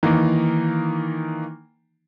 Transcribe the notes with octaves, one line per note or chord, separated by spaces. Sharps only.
D#3 E3 A#3 D#4